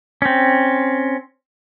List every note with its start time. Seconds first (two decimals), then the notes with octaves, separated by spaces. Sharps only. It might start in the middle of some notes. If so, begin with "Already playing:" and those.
0.22 C4 C#4